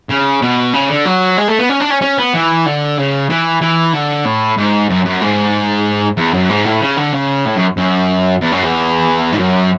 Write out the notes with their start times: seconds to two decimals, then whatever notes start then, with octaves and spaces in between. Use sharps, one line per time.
0.09 C#3
0.42 B2
0.73 C#3
0.89 D3
1.05 F#3
1.37 G#3
1.48 A3
1.59 B3
1.69 C#4
1.80 D4
1.90 C#4
2.01 C#4
2.17 B3
2.34 E3
2.66 D3
2.97 C#3
3.30 E3
3.61 E3
3.93 D3
4.25 A2
4.57 G#2
4.90 F#2
5.05 F#2
5.21 G#2
6.17 E2
6.34 F#2
6.50 G#2
6.65 A2
6.81 C#3
6.97 D3
7.13 C#3
7.45 A2
7.56 F#2
7.77 F#2
8.42 E2
8.52 F#2
8.63 E2
9.32 G#2
9.38 F#2